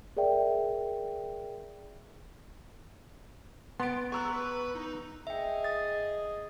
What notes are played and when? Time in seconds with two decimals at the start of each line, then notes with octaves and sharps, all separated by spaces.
0.17 G#4 A#4 D5 E5 G5
3.80 B3 C6 A6 D7
4.12 G#4 A#5 C#6 E6 F#6
4.32 B4
4.75 D#4
5.27 G#4 D#5 E5 G5
5.64 D#6 A6